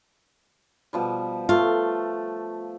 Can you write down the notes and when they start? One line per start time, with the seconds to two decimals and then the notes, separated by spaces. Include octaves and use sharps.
0.93 B2 F3 G3
1.49 A3 F4